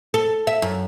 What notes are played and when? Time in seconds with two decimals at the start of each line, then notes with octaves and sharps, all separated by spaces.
0.14 A4
0.47 E5
0.62 F#2